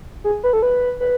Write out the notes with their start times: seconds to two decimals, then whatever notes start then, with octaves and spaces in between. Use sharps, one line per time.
0.24 G#4
0.44 B4
0.53 A4
0.62 B4
1.00 B4